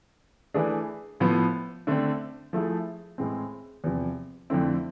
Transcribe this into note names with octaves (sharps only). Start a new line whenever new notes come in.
E3 A3 D4 G#4
A2 F3 B3
D3 A3 C4
F3 A3 E4 G#4
A2 E3 G#3 C4
E2 C3 F3
F2 D3 A3 C4 E4